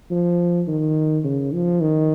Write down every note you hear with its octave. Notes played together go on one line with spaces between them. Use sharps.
F3
D#3
C#3
F3
D#3